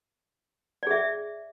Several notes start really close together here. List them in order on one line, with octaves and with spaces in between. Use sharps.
D5 G#4 E5